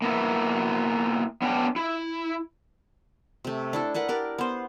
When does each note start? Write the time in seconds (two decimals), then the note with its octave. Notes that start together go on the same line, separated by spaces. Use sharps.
0.02 A#3 B3 E4
1.42 B3 C#4 D4 G5
1.76 E4
3.44 C3 A3
3.73 D4 E4 A4
3.94 D4 A#4 B4 F#5
4.09 G4 A#4 D5
4.38 B3 C5